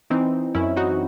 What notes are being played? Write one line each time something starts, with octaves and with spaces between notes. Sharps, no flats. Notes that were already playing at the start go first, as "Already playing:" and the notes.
E3 C4 D#4
F#2 C#4 E4
D#4 F#4